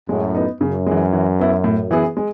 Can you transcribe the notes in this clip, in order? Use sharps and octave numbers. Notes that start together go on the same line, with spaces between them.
F#2 A2 G#3
B3 D#4
F#2 C#3
E3 G#3
E3
B3 E4
A2
E3 B3 E4 G#4
G#3